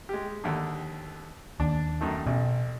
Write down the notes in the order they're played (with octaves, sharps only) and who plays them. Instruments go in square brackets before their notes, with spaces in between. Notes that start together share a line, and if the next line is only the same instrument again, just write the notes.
[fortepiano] G#3 G4
D#2 D3
[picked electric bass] D#2 [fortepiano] D4
[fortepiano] F#2 D#3 A3
[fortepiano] A1 [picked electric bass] B2